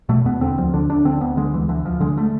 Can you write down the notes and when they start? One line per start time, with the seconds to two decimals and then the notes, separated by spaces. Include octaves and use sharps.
0.09 B2 A3
0.25 E2 B3
0.41 D3 C4
0.58 D2 F3
0.73 D3 D4
0.89 D2 D4
1.05 D3 C4
1.21 D2 B3
1.37 D3 G#3
1.53 D2 E3
1.69 D3 E3
1.85 D2 F3
2.00 D3 G#3
2.17 A3